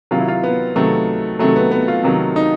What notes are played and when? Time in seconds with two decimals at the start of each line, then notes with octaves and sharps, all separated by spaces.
0.11 C3 D#3 F#3 F4
0.19 E4
0.28 F4
0.43 B3
0.76 C3 D#3 F#3 A3
1.39 C3 D#3 F#3 A3
1.56 B3
1.71 B3
1.88 F4
2.03 C3 D#3 F#3
2.36 D#4